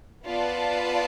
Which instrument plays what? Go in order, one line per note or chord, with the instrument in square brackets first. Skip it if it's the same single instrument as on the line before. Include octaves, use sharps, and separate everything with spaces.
[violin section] B3 F4 B4 D5 A5